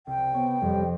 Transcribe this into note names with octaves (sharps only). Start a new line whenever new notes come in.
C2 G5
B3 C#5
F2 G3